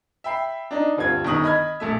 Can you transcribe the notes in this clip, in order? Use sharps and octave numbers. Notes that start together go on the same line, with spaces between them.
E5 G5 B5 C7
D4 D#4
D2 G2 C4 F4 G#6
G1 D#3 C#6 D#6 F#7
D#5 B5 F6 G#6
A#1 A3 E5